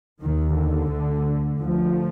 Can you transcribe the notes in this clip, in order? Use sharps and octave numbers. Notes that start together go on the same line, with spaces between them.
D#2 D#3
D3
D2
D2 F3